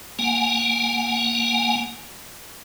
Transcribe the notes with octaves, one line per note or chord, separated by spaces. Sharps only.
A#3 F#5 G#5